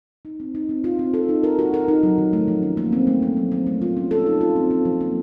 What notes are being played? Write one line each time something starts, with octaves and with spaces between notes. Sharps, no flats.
D#4
C4
D#4
C4
F4
C4
A4
D#4
A#4
F#4
A#4
D#4
F#3
D#3
A3
F3
C#4
A#3
C4
A3
A3
F#3
C4
A3
F4
C#4
A4
D#4
F4
C4
C4
F3
A#3